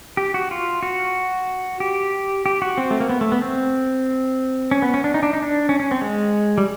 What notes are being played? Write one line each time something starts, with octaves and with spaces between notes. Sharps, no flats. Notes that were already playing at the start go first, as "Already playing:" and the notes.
G4
F#4
F4
F#4
G4
G4
F#4
C4
A3
A#3
B3
A3
B3
C4
C#4
B3
C#4
D4
D#4
D4
D#4
D4
C#4
C#4
C4
G#3
G3